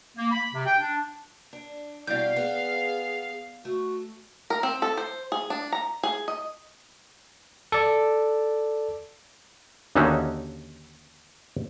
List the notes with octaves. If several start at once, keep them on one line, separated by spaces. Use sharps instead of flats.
A#3
B5
C3
G5
D4
D4
B2 G3 E4 D5 F5 G6
B3 G#4
A3 F#4
A#4
C4
A4
C5
G#4
D4
A#5
G#4
D#5
A4 D5
D#2 D3 C#4 D#4 F#4 E5